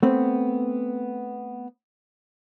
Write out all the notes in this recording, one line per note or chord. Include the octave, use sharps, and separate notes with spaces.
A3 B3 C4